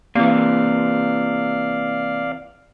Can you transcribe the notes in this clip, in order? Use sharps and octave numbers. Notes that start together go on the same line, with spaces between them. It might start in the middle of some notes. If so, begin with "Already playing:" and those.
C3 E3 A#3 D5 F5